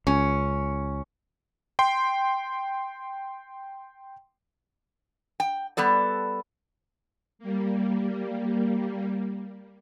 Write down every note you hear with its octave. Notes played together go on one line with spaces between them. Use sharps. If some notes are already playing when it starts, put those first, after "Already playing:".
C#2 C#4
G5 C6
G5
G3 B3 A4 D5
G3 A#3